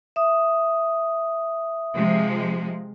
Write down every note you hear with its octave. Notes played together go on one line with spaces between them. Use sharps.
E5 D#6
C3 F3 G#3